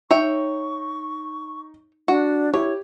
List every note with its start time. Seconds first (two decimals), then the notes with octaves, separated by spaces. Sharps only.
0.11 D#4 C#5 E5 G5 C#6
2.08 D4 F#4
2.54 E4 G4 C#5